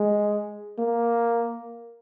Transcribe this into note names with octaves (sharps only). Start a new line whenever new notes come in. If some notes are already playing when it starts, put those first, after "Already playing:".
Already playing: G#3
A#3